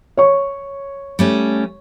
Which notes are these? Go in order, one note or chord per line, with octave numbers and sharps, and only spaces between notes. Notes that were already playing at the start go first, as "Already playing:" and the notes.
C#5 C#6
G3 A3 C#4